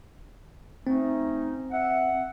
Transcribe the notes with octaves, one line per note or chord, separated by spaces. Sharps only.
A3 C4 C#4 D#4
E5 F#5